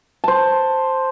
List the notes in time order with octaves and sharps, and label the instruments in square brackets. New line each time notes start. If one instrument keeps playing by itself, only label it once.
[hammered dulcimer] C5 A5